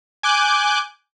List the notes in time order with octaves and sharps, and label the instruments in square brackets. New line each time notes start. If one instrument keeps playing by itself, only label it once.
[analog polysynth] G#5 D6 F#6 G6